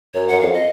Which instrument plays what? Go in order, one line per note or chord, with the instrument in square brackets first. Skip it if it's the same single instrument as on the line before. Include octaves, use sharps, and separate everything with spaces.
[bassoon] F#2 [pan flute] C#5
[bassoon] F#2 [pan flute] F#5
[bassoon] F2 [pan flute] F5
[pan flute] D#5